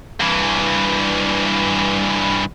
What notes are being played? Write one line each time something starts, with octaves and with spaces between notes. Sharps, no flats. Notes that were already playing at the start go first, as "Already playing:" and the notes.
G2 E3